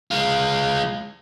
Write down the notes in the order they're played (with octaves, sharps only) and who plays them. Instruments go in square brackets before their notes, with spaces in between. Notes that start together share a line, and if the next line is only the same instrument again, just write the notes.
[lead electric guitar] G#3 F4